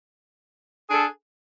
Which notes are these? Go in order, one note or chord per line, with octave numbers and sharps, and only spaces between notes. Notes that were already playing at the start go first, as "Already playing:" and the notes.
D4 G#4 A4